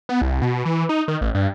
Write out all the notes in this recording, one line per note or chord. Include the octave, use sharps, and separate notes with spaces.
B3
C2
B2
E3
D#4
D#3
A1
G2